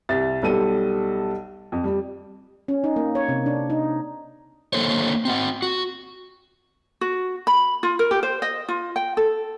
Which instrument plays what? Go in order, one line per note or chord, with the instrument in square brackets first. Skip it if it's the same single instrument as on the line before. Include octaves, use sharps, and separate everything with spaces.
[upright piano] C2 E5 A6
B1 G3 A4 D#7
F2
G3
[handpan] C#4
D#4
A#3
C#5
C3
D4
D#4
[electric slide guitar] D3 D#3 A#3 A4 C5 C#5
C4 F#4 F#5
F#4
[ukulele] F#4
B5
F4
A#4
G4
C5
D#5
F4
G5
A4